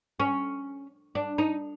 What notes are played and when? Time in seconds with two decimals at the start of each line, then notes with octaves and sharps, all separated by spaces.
0.20 C#4
1.15 D4
1.38 D#4